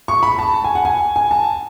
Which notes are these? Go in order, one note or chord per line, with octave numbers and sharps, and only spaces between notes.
C#6
B5
A5
A5
G#5
F#5
G#5
G#5
A5